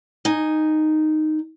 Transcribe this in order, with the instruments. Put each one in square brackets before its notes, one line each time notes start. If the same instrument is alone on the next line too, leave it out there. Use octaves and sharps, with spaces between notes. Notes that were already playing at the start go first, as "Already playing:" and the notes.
[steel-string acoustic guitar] D#4 G#5